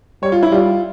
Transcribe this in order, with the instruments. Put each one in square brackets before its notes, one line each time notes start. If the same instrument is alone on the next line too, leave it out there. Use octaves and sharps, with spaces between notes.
[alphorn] G3 [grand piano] C#5
[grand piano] F4
E4
[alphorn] G3 [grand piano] F4